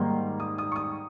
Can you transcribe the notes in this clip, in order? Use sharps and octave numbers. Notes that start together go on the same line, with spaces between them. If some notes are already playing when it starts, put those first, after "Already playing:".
Already playing: G#2 D#3 G3 A#3 C6
D#6
D#6
C#6
D#6